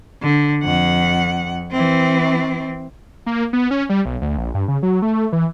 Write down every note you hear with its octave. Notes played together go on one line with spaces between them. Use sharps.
D3
F2 F#5
E3 C4
A#3
B3
C#4
G3
B1
D2
A#1
G2
C#3
F#3
A3
E3